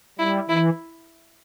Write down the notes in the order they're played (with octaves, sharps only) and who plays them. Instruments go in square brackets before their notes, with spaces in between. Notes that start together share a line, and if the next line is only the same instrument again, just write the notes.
[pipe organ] G3 [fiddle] E4
[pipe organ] E3 [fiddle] E4